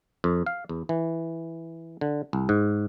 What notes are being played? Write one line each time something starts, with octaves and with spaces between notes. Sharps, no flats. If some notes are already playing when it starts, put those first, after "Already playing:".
F2
F5
E2
E3
D3
C2
G#2